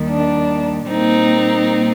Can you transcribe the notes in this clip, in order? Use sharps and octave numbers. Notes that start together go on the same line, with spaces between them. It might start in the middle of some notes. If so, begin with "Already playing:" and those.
Already playing: D#2 D#3 G3
D4
A#2 G3 A#3 C4 D#4